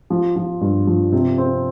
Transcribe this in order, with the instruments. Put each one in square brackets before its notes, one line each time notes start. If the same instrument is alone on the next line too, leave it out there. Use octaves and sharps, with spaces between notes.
[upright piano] F3
F3
G2
F3
C3
C4